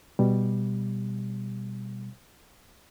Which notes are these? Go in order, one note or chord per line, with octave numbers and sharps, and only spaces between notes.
B2 G3